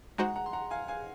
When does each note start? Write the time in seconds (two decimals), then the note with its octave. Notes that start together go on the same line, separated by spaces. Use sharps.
0.18 G#3 D#4 F#4 C5 F#5 A#5
0.36 F#5 A#5
0.46 C6
0.53 F#5 A#5
0.71 F5 G#5
0.88 F5 G#5